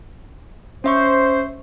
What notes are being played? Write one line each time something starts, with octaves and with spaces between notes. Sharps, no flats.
C#4 C5 E5 C#6